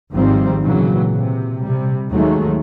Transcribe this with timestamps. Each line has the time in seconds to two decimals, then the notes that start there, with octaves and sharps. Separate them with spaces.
0.12 G#1 G#2 D#3 F3 G3 C4
0.63 A#2 C#3 E3 F#3
1.15 C3
1.62 C3 G3
2.09 D#2 D#3 F#3 G#3 A3